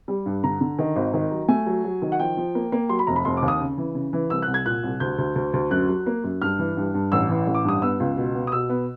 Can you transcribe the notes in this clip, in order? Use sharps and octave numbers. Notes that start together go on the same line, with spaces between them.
G3
G2
D3 A#5
D3
D#3
G#1
D#3
F#3
A3 G#5
F#3
F#3
D#3
F#5
F3 G5
F3
A#3
A#3
F#3 C6
B5
F1 A#5
B5
F1 C6
D6
D#2
D#6
C#3
E3
C#3
E3
C2 E6
F#6
C2
G#6
A#2 F#6
C2
D2 G6
D2
D2
D2
F#2 F#6
F#3
A#3
F#2
G2 F6
E3
G2
G2
A1 E6
E3
A1
D6
G2 D#6
B3 E6
C#2
B2
B3
D#6
B2 E6
B3